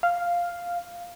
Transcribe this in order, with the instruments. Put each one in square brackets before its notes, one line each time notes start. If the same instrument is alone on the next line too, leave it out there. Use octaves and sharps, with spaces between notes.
[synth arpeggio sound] F5